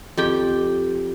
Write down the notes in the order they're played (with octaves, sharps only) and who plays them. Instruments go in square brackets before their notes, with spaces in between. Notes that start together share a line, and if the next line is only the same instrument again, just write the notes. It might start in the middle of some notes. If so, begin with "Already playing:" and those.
[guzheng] F2 G4 G5